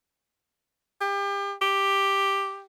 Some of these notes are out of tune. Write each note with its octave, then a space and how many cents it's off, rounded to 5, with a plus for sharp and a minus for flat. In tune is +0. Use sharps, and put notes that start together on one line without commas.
G4 +35
G4 +5